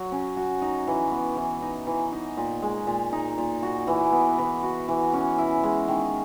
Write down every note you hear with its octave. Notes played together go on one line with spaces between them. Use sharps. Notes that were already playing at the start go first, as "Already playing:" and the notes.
Already playing: F#3 F#4
C#4
F#4
D#4
E3
B3
E3
D#4
E3
D#4
A#2
G#3
A#2
D#4
A#2
F#4
E3
B3
E3
F#4
E3
C#4
E4
G#3
D#3